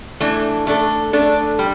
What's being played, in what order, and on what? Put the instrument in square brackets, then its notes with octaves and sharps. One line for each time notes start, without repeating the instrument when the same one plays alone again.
[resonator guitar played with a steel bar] E3 A3 D4
A3 D4 A4
A3 D4 A4
G3